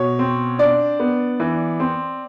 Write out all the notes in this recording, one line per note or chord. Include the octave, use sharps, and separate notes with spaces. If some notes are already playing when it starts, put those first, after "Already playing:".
Already playing: B2 C#5
C4
D4 D5
B3
E3
C4